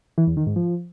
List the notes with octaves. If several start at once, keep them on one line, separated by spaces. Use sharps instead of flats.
E3
E2
D#3
G#2
F3